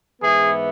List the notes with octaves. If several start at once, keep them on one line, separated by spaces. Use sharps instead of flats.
G#2 E3 B3 G#4